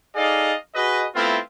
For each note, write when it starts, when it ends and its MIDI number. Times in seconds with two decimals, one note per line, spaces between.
0.15 0.54 63
0.15 0.54 68
0.15 0.54 69
0.15 0.54 74
0.15 0.54 75
0.15 0.54 77
0.75 1.05 66
0.75 1.05 68
0.75 1.05 71
0.75 1.05 75
1.14 1.38 57
1.14 1.38 59
1.14 1.38 60
1.14 1.38 64
1.14 1.38 65